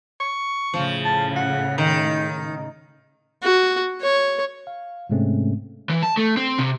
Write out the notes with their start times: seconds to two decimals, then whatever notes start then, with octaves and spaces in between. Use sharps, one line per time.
0.20 C#6
0.74 A2 C#3 F3
1.05 A5
1.36 F#5
1.78 D#3 D#4
3.43 F#4
4.02 C#5
4.67 F5
5.10 G#2 C3 G#3 A3 C4 C#4
5.89 E3
6.03 A5
6.17 A3
6.37 C4
6.59 C3